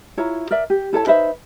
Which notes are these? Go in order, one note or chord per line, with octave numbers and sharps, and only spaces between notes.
E4 F4 C#5 A#5
A#4 D5 E5
G4
E4 A4 C#5 A5
D#4 B4 C5 E5